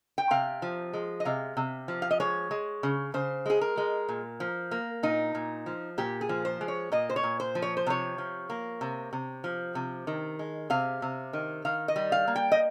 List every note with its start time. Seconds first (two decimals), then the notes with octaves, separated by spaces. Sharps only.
0.18 G5
0.31 C3 F5
0.62 F3
0.94 G#3
1.20 D#5
1.25 C3 F5
1.57 C3
1.88 F3
2.02 F5
2.11 D#5
2.20 G#3 C#5
2.51 G#3
2.83 C#3
3.14 C#3 C5
3.46 G#3 G#4
3.61 A#4
3.77 G#3
4.09 A#2
4.40 F3
4.71 A#3
5.03 A#2 D#4
5.35 A#2
5.66 F3
5.98 A#2 G4
6.21 G#4
6.29 F3
6.45 C5
6.61 G#3
6.68 C#5
6.92 A#2 D#5
7.10 C5
7.16 C#5
7.23 A#2
7.40 C5
7.55 F3
7.62 C#5
7.77 C5
7.87 C3 C#5
8.18 F3
8.50 A#3
8.81 C3
9.13 C3
9.44 F3
9.75 C3
10.07 D#3
10.39 G#3
10.70 C3 F5
11.02 C3
11.33 D#3
11.65 D#3 F5
11.88 D#5
11.96 G3
12.12 F5
12.28 A#3
12.36 G5
12.52 D#5